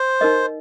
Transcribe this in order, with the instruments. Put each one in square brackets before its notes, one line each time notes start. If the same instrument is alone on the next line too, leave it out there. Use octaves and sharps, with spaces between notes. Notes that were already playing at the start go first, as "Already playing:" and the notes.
Already playing: [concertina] C5
[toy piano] D#4 A#4 D#5